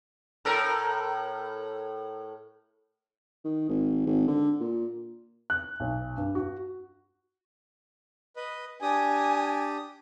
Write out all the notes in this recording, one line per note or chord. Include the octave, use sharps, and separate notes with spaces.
A2 A4 A#4
D#3
G#1
G#1
D3
A#2
F#6
B1
G2
F#4
B4 D#5
D4 G4 G#5 D#6